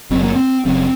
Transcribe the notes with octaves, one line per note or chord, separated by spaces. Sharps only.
F#1 F#2 C#3 C4
A#3
C4
F#1 F#2 C#3 C4